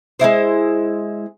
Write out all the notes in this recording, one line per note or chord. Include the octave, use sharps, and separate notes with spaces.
G#3 D#4 E4 C5